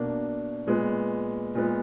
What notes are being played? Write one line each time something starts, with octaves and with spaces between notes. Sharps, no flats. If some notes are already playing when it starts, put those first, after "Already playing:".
Already playing: B2 A#3 D4
A#2 G#3 B3
A#2 G#3 B3